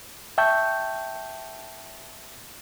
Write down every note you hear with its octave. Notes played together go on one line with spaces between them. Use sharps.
E5 G5 A5 C#6 G6